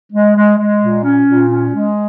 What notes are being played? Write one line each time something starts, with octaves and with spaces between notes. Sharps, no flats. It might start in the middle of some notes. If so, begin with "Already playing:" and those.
G#3
G#3
G#3
A#2
C#4
A#2
C#4
G#3